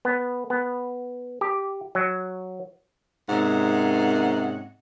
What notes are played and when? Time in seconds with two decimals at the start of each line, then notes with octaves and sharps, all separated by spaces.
0.05 B3
0.50 B3
1.41 G4
1.95 F#3
3.29 G#2 C3 A#3 C#4 D#5 F#5